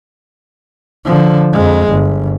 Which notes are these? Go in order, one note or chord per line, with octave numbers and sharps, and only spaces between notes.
D3 F3
F2 G#3
G1